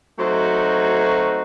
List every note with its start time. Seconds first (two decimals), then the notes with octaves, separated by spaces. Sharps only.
0.18 F#3 A3 C4 D#4 F#4